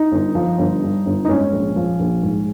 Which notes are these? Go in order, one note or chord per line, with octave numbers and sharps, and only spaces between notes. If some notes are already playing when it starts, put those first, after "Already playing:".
Already playing: D#4
G1
F3
G1
G2
G1
D#4
G#2 C#4
A#1
F3
A#1
G#2